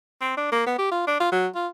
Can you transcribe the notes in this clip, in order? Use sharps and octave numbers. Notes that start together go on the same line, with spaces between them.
C4
D4
A#3
B3
G4
F4
D4
F4
F#3
F4